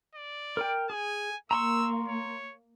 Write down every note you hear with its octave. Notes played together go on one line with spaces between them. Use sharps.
D5
A#4 G5
G#4 G#5
A#3 A#5 C6 C#6 E6
C#5